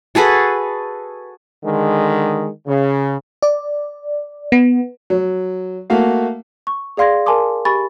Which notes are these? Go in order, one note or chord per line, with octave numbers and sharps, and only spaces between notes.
F#4 G#4 A4 B4
D3 D#3 G#3
C#3
D5
B3
F#3
A3 A#3 F#4 F5
C#6
G#4 D5 F5 C6 G#6 A#6
A#4 G#5 A5 C6 D6 D#6
G4 G#5 B5 C#6 A6